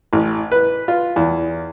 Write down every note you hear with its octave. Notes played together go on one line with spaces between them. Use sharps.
A1
B4
F4
E2